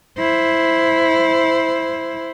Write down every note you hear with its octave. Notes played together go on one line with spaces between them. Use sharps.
E4 C5